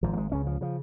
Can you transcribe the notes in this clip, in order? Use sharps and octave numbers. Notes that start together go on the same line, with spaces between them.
G#1 G#2 F3
A#3
G#3
C#2 C#3 C#4
F3
C#3 F3